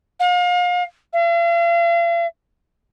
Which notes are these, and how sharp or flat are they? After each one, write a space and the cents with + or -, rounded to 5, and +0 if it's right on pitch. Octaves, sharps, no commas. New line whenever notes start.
F5 +35
F5 -45